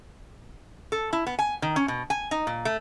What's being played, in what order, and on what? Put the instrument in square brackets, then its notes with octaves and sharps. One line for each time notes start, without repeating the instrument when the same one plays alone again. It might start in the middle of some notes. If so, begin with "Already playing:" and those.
[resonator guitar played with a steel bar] A4
E4
B3
G#5
D#3
C#4
B2
G#5
D#4
A#2
A3